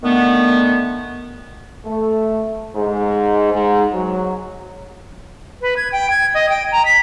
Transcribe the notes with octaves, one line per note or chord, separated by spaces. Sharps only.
D3 D#3 A3 B3
A3
G#2
G#2
F#3
B4
G#6
G5
G#6
D#5
G5
A#5
B6